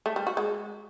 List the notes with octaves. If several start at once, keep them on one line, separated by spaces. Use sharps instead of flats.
A3
G3
F#4
G#3